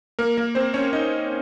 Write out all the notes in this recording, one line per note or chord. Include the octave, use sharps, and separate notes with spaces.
A#3 A#4
A#3 A#4
C4 C5
C#4 C#5
D#4 D#5